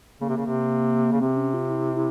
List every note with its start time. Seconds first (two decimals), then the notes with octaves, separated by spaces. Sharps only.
0.21 C#3 A#3
0.29 C3
0.37 C#3
0.46 C3
1.12 C#3
1.21 C3 C4
1.37 C#4
1.54 F4
1.70 E4
1.96 E4